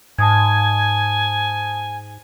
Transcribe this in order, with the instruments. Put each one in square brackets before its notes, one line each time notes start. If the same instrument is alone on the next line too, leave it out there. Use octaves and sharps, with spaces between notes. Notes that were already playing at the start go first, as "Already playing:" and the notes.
[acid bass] G#2 [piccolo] G#5 [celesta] A5 D#6 G#6